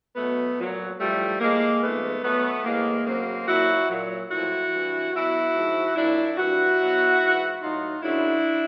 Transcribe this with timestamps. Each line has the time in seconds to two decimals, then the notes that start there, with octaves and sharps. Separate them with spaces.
0.15 B2 F#3 A3 B3
0.57 A#2 F#3
0.99 A2 F3 G3 A3
1.40 A2 F3 G#3 A#3
1.81 G#2 F3 A3 B3
2.23 B2 F#3 A3 B3
2.64 A2 E3 G#3 A#3
3.06 F#2 C#3 F#3 A#3 C4
3.47 A#2 F#3 E4 F#4
3.89 A#2 F#3
4.29 A2 F3 E4 F#4
4.71 G2 E3
5.12 B2 F#3 E4 F#4
5.54 G#2 F3
5.95 A#2 F#3 D4 E4
6.36 G2 E3 E4 F#4
6.78 B2 F#3
7.19 G#2 E3
7.61 A2 F#3 D#4 F4
8.02 F#2 C#3 F#3 D4 E4